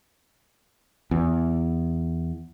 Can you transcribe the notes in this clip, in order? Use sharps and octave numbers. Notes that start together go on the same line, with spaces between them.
E2